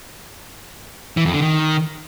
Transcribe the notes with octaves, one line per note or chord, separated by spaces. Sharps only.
E3
F2
D3
D#3